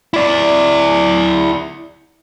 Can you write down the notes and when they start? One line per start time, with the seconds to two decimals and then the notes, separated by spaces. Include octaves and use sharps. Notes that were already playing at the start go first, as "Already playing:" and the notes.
0.14 E4 D5